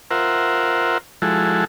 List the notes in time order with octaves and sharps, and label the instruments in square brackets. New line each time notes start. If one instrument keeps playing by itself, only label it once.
[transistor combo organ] F4 A#4 C5 E5 F#5
F3 G#3 E4 F#4 A4